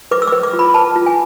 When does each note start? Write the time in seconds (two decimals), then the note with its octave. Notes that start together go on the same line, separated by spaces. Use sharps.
0.11 B4 D6
0.22 E6
0.28 B4 D6
0.43 D6
0.53 F4
0.59 B5
0.74 B4 A5
0.96 F4
1.06 G#5